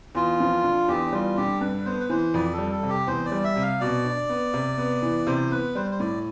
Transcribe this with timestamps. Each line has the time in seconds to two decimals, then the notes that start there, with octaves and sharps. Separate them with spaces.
0.15 E2 F4
0.40 F3
0.63 D3
0.88 E2 G4
1.12 G3 F4
1.37 D3 G4
1.61 G2 B4
1.85 B3 C5
2.00 B4
2.10 E3 C5
2.34 F2 D5
2.53 A4
2.58 G3
2.71 A4
2.83 C3
2.89 G4
3.07 E2 C5
3.25 D5
3.32 G3
3.44 E5
3.56 C3
3.62 F5
3.81 B2 D5
4.05 D4
4.29 B3
4.54 C3
4.78 B3
5.02 E3
5.27 C3 C5
5.51 B3 B4
5.75 G3 C5
5.91 C5
6.00 A2 D5